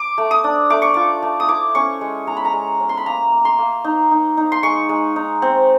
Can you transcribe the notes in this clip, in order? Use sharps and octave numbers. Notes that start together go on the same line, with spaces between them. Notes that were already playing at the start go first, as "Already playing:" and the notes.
Already playing: D6
A3
D#6
D4
A3 D6
C#6
F4 D6
A3
D#6
E4 D6
C#4 C#6
G#3
G#3 A#5
B5
A#5
G#3
C#4
C6
B5
A#3 A#5
A#3
C6
A#3
D#4
D#4
D#4
C6
G#3 C#6
G#3
D#4
C4